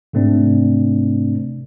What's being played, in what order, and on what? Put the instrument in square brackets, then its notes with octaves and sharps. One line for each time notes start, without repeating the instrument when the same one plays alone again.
[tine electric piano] G#2 C3 A3 C4 D4